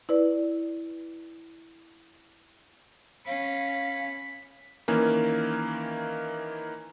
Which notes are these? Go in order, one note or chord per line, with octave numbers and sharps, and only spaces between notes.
E4 B4 D5
C#4 F5 B5
D#3 E3 A#3 C#4